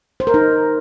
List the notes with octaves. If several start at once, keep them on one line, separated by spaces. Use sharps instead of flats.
C5
A#4
D#4